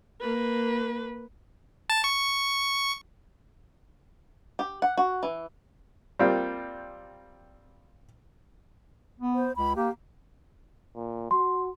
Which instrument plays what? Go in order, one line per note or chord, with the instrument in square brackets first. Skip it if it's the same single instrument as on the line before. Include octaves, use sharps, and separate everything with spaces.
[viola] A#3 B4
[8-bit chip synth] A5
C#6
[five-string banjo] G4
F#5
F#4
E3
[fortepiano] G3 A#3 C4 F4
[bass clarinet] B3
[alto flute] C5
[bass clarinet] C#2 [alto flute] B5
[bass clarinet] A#3 [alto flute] G4
[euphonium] A#2
[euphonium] F#4 [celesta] C6